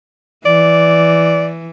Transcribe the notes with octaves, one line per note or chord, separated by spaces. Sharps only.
E3 D5